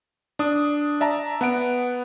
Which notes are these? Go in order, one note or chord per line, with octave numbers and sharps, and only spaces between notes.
D4 D#6
D5 E5 A5 A#5
B3 F#5 D7